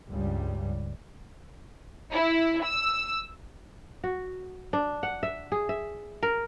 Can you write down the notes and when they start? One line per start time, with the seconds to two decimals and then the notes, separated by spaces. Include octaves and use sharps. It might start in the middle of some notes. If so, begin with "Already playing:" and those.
0.11 C#2 G2 G3
2.12 E4
2.64 E6
4.04 F#4
4.73 D4
5.03 F#5
5.23 E5
5.52 G#4
5.69 E5
6.23 A#4